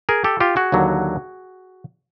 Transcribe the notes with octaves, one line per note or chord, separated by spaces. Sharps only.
G#4 A#4
G4 A4
F4 G4
F#4 G#4
D#2 D3 F#3